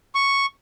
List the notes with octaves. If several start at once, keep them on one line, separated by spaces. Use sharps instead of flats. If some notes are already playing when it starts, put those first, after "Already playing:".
C#6